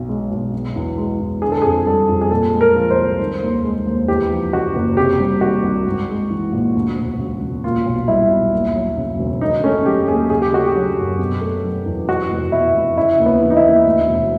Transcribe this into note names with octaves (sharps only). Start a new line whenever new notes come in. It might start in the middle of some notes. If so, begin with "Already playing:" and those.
Already playing: B1 B2
G#3
B1
B2
E2
G#3
E2
D3 G#4
A4
F2 G#4
G3 A4
F2
G#4
A#2 A4
G#3
A#4
F3
C5
C2
D#3
D#2
G#3
D#2
E2 G4
F3
C#3 F#4
F#1
C3 G4
G3
D#3 F#4
C2
G#2
G#3
E3
A#1
D2
E1
C#3
E1
A#2 F4
B1
G3 E4
B1
D#2
F#3
C#3
E1
D#3 D#4
A3 C#4
F#3 G4
D#2 G#4
C#3 G#4
G4
A3 F#4
G4
F#3
F#2
B2
A3
F#3
E2
E2 F#4
F1
B2 E4
F1
C#3 E4
D#2
B3
E3
D#4
E4
D#2
D2
E1